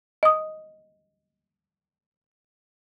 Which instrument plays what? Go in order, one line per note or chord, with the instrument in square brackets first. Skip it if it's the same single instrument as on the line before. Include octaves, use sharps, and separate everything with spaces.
[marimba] D#5 D#6